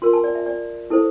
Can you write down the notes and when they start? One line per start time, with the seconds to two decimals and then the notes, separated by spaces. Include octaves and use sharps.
0.02 F4 A#4 C6
0.13 A5
0.24 D5
0.35 E5
0.46 D5
0.90 E4 A4 C5